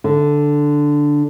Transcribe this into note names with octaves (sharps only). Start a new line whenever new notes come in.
D3